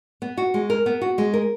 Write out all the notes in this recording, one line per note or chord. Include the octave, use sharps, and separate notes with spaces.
B3
F#4
G#3
A#4
B3
F#4
G#3
A#4